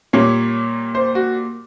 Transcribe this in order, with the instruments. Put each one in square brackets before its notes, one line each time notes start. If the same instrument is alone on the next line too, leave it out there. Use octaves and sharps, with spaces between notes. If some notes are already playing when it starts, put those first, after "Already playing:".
[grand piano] A#2 G3 A#3 C#5
C5
F#4